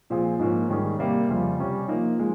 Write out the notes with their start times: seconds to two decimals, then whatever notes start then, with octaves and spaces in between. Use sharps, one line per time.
0.10 A#2 F3 C4 F4 G#4
0.39 G#2 F3 A#3 C#4
0.69 G#2 D#3 G3 C#4 G#4
0.99 C3 G3 A#3
1.29 F2 C#3 G3 C4 F4
1.59 C3 G3 C#4
1.88 F3 A#3 D#4
2.18 F3 G#3